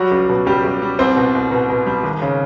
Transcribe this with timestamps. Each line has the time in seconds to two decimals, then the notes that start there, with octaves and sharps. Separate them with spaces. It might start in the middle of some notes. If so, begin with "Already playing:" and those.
Already playing: F#3 G3 F#4
0.11 C#2
0.29 B2
0.46 C#2 G3 G4
0.64 C#2
0.82 G3
0.99 C2 C4 C5
1.17 B2
1.35 C2
1.51 B2
1.70 B2
1.86 G3
2.03 G#1
2.22 C#3